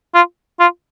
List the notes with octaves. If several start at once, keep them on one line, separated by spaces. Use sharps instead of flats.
F4
F4